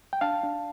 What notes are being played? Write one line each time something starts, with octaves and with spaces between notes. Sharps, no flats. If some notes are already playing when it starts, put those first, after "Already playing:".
G5
D4 F5 A5
D4